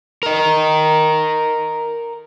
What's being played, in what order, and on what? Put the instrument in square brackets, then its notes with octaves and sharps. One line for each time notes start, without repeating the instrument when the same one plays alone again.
[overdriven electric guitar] A#4 D#5